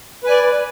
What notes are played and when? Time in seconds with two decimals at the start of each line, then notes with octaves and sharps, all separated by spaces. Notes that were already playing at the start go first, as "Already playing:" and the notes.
0.24 B4
0.27 G#5
0.30 D5